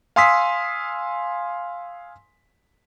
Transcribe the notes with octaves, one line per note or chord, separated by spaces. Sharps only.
F5 G#5 C6 D#6 E6 B6